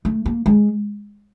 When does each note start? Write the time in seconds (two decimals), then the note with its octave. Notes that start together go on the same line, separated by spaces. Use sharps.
0.05 A3
0.26 A#3
0.46 G#3